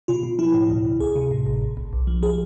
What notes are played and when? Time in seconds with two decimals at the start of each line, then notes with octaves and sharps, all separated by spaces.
0.08 B2 F4
0.23 B2
0.39 F3 E4
0.54 A2
0.70 D2
0.85 D2
1.00 D2 G#4
1.16 C3
1.31 A2
1.47 A1
1.61 G#1
1.77 G#1
1.93 B1
2.07 F3
2.22 F3 G#4